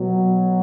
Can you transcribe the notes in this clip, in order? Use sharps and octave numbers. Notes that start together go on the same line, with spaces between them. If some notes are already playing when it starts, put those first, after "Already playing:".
Already playing: B2 F#3